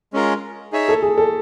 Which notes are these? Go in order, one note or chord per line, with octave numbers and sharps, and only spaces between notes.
G#3 C#4 F4 A#4
D#4 G#4 C#5 E5
A4
G#4
A4